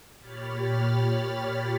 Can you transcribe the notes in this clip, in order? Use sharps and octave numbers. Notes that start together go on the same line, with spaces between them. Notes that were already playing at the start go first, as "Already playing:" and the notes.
A#2 G4 C#5 B5 F6 A6